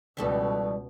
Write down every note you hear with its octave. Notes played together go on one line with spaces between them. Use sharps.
C#2 B2 E3 G3 A4